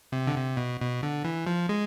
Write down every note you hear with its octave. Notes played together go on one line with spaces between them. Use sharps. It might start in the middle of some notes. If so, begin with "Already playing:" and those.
C3
D3
C3
B2
B2
D3
E3
F3
G#3